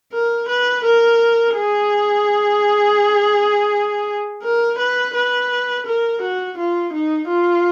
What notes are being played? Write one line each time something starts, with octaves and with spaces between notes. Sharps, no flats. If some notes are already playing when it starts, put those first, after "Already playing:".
A#4
B4
A#4
G#4
A#4
B4
B4
A#4
F#4
F4
D#4
F4